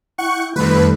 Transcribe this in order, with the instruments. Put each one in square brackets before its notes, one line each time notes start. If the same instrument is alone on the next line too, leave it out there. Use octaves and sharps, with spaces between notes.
[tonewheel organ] E4 G5 [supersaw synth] F#5 C#6
[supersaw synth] F2 B4 [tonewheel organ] D#3 G3 A3